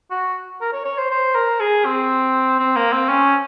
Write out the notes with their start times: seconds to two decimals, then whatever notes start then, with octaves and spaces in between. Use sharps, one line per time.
0.11 F#4
0.61 A#4
0.73 C#5
0.85 C#5
0.98 C5
1.11 C5
1.35 A#4
1.60 G#4
1.85 C4
2.59 C4
2.76 A#3
2.92 C4
3.09 C#4